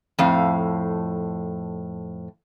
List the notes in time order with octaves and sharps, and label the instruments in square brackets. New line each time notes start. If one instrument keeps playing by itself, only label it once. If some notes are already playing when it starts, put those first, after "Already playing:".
[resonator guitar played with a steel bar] F2 A2 F5